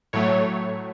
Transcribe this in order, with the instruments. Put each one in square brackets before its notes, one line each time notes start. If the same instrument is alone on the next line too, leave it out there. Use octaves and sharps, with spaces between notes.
[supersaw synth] A2 F#3 A3 C#5